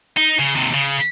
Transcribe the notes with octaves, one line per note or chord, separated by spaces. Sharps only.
D#4
C#3
D#2 C3
C#3